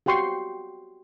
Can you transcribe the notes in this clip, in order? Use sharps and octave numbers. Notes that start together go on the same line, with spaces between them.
F#4 G4 G5 C6 C#6